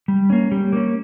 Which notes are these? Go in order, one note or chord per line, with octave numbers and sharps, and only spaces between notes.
G3
A#3 C#4
G3
A#3 C#4